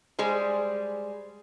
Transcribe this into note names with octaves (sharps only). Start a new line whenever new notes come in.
G3 G#3 G#4 C5